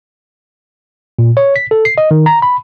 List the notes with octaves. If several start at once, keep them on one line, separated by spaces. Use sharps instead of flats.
A#2
C#5
B6
A4
C7
D#5
D#3
A#5
B5